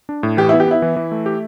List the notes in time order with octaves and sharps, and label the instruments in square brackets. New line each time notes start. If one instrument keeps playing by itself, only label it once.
[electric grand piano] D4
A2
[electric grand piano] E3 [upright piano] G4
[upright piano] E4
[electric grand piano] B3
[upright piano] G4
[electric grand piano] B3 [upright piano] E4
[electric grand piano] E3
E3
A3
G4